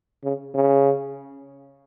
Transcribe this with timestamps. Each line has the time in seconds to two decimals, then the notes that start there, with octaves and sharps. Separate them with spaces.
0.24 C#3
0.54 C#3